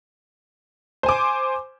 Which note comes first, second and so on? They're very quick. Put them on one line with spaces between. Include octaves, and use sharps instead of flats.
C5 G#5 D6